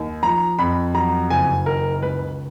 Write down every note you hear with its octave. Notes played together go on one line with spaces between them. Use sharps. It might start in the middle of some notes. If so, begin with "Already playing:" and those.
Already playing: D#2
F3 A#5
F2 B5
F#3 A#5
F#1 G#5
D#3 A#4
C#2 B4